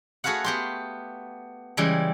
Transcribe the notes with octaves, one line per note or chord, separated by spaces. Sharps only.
A3 F#4 G#4 B4 F5 F#5
B3 G4 C6
C#3 E3 G3 G#3